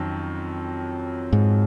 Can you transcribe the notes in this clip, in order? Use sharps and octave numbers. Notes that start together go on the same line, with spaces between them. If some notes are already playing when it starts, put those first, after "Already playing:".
Already playing: F2 D#3 F#3 C#4
G#2